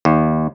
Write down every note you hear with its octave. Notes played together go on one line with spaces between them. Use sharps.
D#2